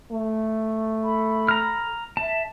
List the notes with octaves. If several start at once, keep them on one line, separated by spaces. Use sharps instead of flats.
A3
A4 B5
A#5 F6
E5 A5